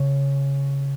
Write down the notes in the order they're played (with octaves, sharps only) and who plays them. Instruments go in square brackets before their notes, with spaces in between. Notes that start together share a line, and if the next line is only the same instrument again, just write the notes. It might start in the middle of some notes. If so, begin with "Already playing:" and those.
Already playing: [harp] C#3